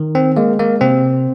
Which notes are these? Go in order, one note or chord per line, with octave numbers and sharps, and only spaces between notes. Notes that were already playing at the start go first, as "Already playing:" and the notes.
Already playing: D#3
C4
G#3 A#3
A#3
C3 C4